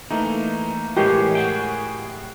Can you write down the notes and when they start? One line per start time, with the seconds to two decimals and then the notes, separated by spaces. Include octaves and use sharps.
0.11 E3 A3 A#3 D#4
0.96 A2 E3 G#3 G4 A#4 C#5
1.35 F#4 G#4 G5